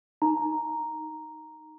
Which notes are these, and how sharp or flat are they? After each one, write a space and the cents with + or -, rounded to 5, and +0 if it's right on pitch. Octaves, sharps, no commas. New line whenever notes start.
D#4 +0 A#5 +0